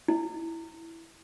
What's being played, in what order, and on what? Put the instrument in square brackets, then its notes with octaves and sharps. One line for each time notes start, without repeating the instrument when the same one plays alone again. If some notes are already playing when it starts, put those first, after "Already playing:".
[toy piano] E4